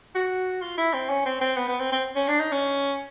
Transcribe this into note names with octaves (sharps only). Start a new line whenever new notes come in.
F#4
F4
E4
C4
C#4
C4
C4
B3
B3
C4
C4
C#4
D4
D#4
C#4